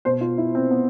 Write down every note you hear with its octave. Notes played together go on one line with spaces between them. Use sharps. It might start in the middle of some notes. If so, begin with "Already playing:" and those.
B2 C5
F4
E4
C4
B3